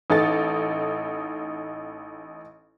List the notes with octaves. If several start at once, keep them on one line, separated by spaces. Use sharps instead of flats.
A1 D#4 A4 A6